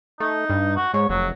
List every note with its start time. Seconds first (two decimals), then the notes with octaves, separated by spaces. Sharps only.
0.20 A3 D#4
0.50 G2
0.76 F#4
0.94 G#2 C#5
1.09 F1 F#3